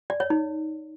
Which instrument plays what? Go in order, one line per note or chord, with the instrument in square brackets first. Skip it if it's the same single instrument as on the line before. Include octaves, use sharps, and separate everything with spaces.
[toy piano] D5
C#5
D#4